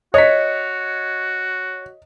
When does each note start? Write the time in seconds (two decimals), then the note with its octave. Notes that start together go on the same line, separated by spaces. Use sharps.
0.14 F#4 C#5 D#5 B6